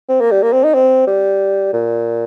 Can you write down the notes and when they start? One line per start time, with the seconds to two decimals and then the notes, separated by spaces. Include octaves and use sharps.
0.09 C4
0.20 A#3
0.31 G3
0.43 A#3
0.52 C4
0.64 D#4
0.74 C4
1.07 G3
1.73 A#2